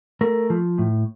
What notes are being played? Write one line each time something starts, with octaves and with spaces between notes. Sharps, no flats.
A3 A#4
F3
A2